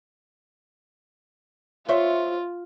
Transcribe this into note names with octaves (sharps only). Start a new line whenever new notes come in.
F4 C5 C#5 E5